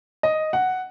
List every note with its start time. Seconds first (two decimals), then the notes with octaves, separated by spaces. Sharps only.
0.23 D#5
0.53 F#5